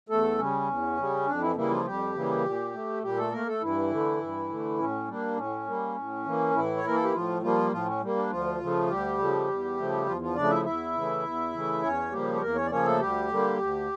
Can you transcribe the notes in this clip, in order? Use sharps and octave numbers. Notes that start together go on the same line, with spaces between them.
E2 A3 A4
C#3 G3 C#4
E2
C#3 G3
F2 D4
E3 E4
C#3 E3 G3 A#3 E4
F3 F4
F2 G3 G4
C#3 E3 G3 A#3
A#2
A3
A#2 G3 G4
A3 A4
A3 A#3 A#4
A3 A4
G2 E3 E4
D3 A3
G2
D3 A3
A2 C#4
G3 A#3 D4
A2 C#4
G3 A#3
A2
E3 A#3
A2 E3 E4
C#5
E3 A#3 A#4
A4
G4
A2 F3 F4
F3 G3 A#3 F4
A2 F3 F4
C#4
G3 A#3
D4
D2 F3 F4
C#3 F3 A3
D2 G3 G4
C#3 F3 A3
E2
C#3 F3 A3
E2 F3 F4
F3 F4
C#3 F3 A3 D4 D5
E4 E5
E2 E4 E5
C#3 E3 A3
E2
C#3 E3 A3
E2 C#4 C#5
C#3 F3 G3 A#3 G4
C#5
E2 A#3 A#4
C#4 C#5
D5
C#3 F3 A#3 C#4 C#5
A3 A4
D2 G3 G4
D3 G3 A#3
D2